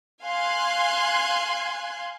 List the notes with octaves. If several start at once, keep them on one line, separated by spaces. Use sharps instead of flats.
F5 G#5 C6 F#6 G#6